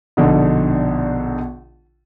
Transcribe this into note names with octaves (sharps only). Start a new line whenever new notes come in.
A#1 B2 D3 D#4